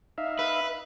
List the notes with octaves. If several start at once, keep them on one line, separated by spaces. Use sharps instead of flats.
D#4 E5 F5
B4